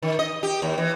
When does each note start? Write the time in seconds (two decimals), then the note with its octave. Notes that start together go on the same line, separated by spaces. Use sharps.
0.03 D#3
0.19 D#5
0.43 G4
0.62 D#2
0.78 E3